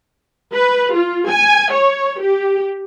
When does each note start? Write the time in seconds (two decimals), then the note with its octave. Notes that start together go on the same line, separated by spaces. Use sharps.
0.53 B4
0.95 F4
1.29 G#5
1.73 C#5
2.21 G4